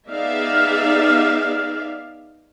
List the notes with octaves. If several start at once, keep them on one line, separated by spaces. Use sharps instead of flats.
B3 D#4 G#4 D5 E5 F5